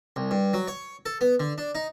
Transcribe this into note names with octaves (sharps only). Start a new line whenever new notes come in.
C2
G2
F#3
C#5
A4
B3
D3
D4
D#4